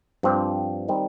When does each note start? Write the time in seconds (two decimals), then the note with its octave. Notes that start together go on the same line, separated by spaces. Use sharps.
0.23 G2 F3 C4 G4
0.88 D#3 G3 C4 D#4